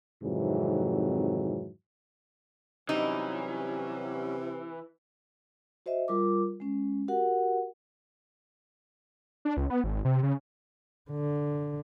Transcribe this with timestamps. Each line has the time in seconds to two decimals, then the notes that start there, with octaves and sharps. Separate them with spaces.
0.22 F2 G#2 C3 D#3 E3 F#3
2.89 C3 E3 F#3 G3 C#4 D#4
5.86 F#4 C5 D#5 E5
6.08 G3 F4 A#4 D6
6.60 G#3 C#4
7.08 F#4 G4 A#4 F#5
9.45 D4
9.57 C#2
9.70 B3
9.84 G#1
10.05 C3
10.23 C#3
11.11 D3